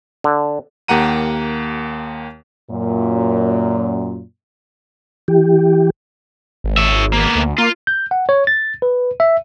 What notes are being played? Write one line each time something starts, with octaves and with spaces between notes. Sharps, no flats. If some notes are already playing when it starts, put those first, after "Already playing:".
D3
D#2 A#3 G4 F#5 A#5 D#7
F#2 A#2
E3 G4
G#1
C#5 E5
A#3 B3
D2
A#3 F4
G6
F#5
C#5
A6
B4
E5